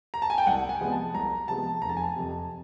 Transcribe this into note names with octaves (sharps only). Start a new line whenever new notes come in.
A#5
A5
G#5
G5
C2 F#5
G#5
C3 F3 G#3 B3
A5
C2 A#5
C3 F3 G#3 B3 A5
F1 A#5
A5
G#5
A5
F2 C3